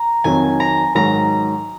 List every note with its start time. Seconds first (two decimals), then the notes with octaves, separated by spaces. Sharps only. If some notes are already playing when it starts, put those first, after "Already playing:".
Already playing: A#5
0.24 F2 D#3 F#3 G#5
0.60 A#5
0.95 G#2 D#3 F#3 A#5